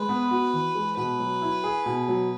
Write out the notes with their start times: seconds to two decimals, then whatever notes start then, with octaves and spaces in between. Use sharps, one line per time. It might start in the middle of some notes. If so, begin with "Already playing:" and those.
Already playing: G#3 B4
0.09 B3
0.31 F#4
0.54 E3
0.75 G#3
0.97 B2 B4
1.19 F#3
1.42 E4
1.64 G#4
1.86 B2
2.08 F#3